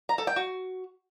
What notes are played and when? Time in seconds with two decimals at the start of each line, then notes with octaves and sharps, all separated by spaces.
0.09 A#5
0.18 A4
0.27 G5
0.36 F#4